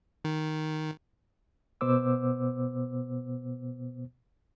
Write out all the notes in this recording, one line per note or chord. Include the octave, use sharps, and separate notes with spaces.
D#3
B2 B3 C5 D6 E6